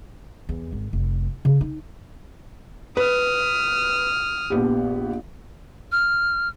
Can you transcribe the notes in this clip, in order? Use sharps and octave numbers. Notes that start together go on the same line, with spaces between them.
E2
G#1
F1
C#3
D#4
B4 D#6 F6
A#1 B3 G4
F6